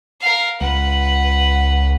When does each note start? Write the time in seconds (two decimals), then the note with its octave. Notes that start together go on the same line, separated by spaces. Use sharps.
0.21 A#4 F5
0.61 C#2 B4 F#5